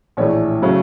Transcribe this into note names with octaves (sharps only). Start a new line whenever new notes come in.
A#1 A2 E3 A3 C#5
C#3 F#3 A3